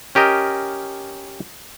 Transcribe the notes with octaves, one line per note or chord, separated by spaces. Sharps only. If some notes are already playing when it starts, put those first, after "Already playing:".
C#4 G4 A#4 D#5